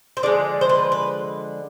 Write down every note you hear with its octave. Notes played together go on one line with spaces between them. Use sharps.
C5
D3 F3 G#3 D5
C5
B4
B4